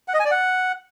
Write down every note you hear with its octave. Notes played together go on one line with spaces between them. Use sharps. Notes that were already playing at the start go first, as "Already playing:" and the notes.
F#5
D#5
G#5
D5
F#5